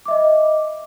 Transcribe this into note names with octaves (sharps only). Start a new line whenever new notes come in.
D#5 E5 D6